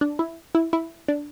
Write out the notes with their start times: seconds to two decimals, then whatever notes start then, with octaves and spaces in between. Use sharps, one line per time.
0.01 D4
0.19 E4
0.55 E4
0.73 E4
1.08 D4